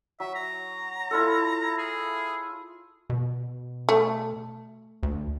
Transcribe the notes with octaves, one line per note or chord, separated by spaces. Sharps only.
F#3 E5
A#5
E4 F4 A4
G#4
B2
A3
D2